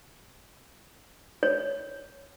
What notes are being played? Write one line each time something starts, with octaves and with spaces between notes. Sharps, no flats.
C#5